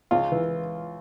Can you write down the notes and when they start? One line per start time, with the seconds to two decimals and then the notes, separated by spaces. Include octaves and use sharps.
0.11 C#2 F4
0.32 E3